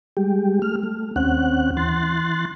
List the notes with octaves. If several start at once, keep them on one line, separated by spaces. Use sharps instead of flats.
G3 G#3 G4
A3 F6
A3
D#2 C4 C#4 F#5 F#6
E3 C6 F#6 A6